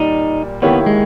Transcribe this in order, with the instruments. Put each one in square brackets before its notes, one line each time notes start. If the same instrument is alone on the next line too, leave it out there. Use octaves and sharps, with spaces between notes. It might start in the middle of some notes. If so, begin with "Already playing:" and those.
Already playing: [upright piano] A#2 G3 [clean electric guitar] D#4
[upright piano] D#3 A#3 E4 G4 C#5 [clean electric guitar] B3
[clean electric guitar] G#3